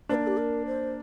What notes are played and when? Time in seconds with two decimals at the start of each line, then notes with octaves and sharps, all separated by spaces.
0.09 A#3 D4 C5
0.15 A#4
0.27 G4
0.37 A#4
0.66 C5